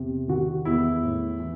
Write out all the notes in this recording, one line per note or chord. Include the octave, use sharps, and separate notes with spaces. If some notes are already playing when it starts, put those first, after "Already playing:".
Already playing: E2 C3
D#3 F#4
E2 E4
A2
E3